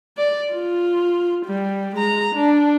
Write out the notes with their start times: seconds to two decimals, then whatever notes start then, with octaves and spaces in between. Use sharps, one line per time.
0.18 D5
0.53 F4
1.46 G3
1.96 G#3 A#5
2.35 D4